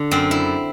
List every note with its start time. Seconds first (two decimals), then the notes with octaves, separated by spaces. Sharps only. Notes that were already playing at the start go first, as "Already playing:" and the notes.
Already playing: D3
0.11 F#2 C4
0.31 E4